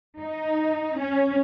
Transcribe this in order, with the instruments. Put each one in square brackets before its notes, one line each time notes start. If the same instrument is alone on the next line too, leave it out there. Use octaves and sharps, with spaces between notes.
[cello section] D#4
C#4